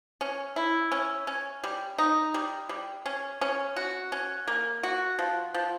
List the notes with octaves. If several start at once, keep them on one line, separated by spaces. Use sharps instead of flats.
C#4
E4
C#4
C#4
G3
D#4
G3
G3
C#4
C#4
F#4
C#4
A#3
F#4
F3
F3